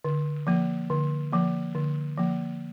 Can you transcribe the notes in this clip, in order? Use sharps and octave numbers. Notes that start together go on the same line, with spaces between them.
D3
F3 A#3
D3
F3 A#3
D3
F3 A#3